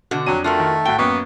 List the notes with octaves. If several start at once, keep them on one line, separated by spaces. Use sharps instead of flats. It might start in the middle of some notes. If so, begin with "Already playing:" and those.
B2 D3 F#4
F2 F#3 D4 D#7
A3 F4 F#4 A#4
D#3
A2 F#4 G5 G7
F#2 A#3 B3 C#6